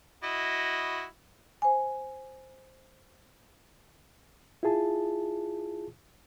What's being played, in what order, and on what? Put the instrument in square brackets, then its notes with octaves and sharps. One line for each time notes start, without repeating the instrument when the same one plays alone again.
[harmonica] E4 F#4 D#5
[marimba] C5 G#5
[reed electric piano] E4 F4 G#4 A5